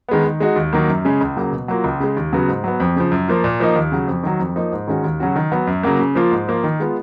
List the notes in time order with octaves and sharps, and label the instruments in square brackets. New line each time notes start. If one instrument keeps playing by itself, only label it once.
[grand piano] D#3 G#3 B3
D#3
G#3 D#4 F#4
D#2
D#3 F#3 A#3
F#2
C#3 G#3 C#4
C#2
C#3 F#3 A#3
B2
F#3 A#3 F4
C#2
C#3 G#3
D#2
C#3 F#3 B3 F#4
G#2
F#3 B3
F2
C#3 F3
F#2
F3 A#3 F4
A#2
F3 A#3 D#4
D#2
C#3 F#3
F2
D#3 F#3
F2
F3 A#3 D#4
G#2
D#3 G#3 C#4 F#4
D#2
C#3 F#3 C#4 F#4
D#3
F#3 B3
F#2
C#3 F#3 A#3
C#3
F3 A#3 F4
G#2
F3 A#3 F4
D#3
G#3 B3 F4